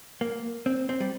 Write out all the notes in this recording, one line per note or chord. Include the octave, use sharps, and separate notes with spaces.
A#3
C4
C4
G3